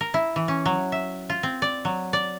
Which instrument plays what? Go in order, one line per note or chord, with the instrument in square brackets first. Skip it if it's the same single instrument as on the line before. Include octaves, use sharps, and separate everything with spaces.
[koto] A#4
E4
E3
C#4
F#3
E5
F4
C4
D5
F#3
D5